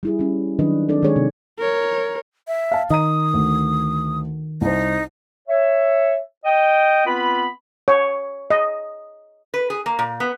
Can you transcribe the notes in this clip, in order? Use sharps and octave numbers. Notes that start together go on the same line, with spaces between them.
G3 E4 G#4
G3 C#4
D#3 F#3 D4 B4 D#5
C4 D4 A4 D5
D#3 G#3 C4 G#4 C#5
C3 C4
A#4 C#5
E5
F5 A5
D#3 D#5 A#5 D#6 D#7
D2
C2 D#4 C5
C#5 E5
D#5 G5
B3 C4 F4 B4 B5
C#5
D#5
B4
G#4
A#3
A#2
B3